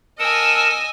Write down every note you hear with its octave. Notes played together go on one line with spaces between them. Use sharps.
A#4 D#5 F#5 G#5 A5 E6